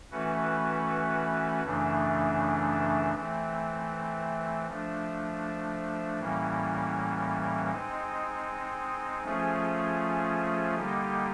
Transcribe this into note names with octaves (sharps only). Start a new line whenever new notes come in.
E3 A3 C#4 F#4 B4
F#2 C#3 E3 A3 D4
E3 A3 C4
F3 A3 D4
A2 E3 G3 A#3 C#4
G#3 C4 D#4
F3 A3 C#4 F4 G#4
D3 G3 A#3 D#4 G4